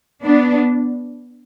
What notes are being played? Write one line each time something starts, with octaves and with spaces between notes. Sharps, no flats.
B3 D4